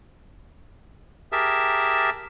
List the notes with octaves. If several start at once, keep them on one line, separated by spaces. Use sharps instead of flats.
G4 G#4 A#4 E5 A5